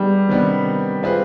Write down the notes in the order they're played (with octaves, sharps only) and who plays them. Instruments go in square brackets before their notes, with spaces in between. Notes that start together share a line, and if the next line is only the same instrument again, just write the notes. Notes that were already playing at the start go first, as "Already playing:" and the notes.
Already playing: [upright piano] G3 [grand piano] G#3 B3 D#4 G#4
[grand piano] C3 D#3 B3 D4
G#3 C4 F4 G#4 B4